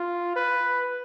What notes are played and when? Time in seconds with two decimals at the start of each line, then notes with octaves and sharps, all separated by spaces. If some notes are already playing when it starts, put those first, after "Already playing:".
Already playing: F4
0.36 B4